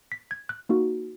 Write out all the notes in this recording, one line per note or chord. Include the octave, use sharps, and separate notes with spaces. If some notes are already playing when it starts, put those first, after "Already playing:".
B6
G#6
F#6
A#3 D#4 F#4